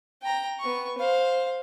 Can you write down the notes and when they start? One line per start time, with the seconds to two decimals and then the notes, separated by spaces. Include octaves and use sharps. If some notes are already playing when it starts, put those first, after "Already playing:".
0.22 G5 A#5
0.60 B3 C#6
0.98 C5 F5